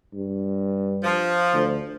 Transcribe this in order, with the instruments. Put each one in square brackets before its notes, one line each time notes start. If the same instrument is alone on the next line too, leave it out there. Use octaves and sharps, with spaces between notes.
[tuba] G2
[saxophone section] F3
[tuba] D2